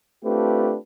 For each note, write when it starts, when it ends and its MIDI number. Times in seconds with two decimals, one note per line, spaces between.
0.25 0.76 57
0.25 0.76 60
0.25 0.76 62
0.25 0.76 65
0.25 0.76 67
0.25 0.76 71